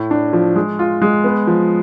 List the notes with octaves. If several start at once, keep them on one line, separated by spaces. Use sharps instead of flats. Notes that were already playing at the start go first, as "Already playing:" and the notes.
Already playing: A2
D4
F3
G#3
F4
G#3
B3
F3